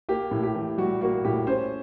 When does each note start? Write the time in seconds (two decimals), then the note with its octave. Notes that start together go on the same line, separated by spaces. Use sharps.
0.09 A#3 G4
0.31 A2
0.43 G4
0.55 E3
0.78 G3 F#4
1.01 A#3 F#4
1.25 A2 G4
1.47 C#4 C5